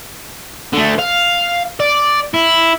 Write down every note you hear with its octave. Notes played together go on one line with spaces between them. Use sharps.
D3 A3
F5
D5
E4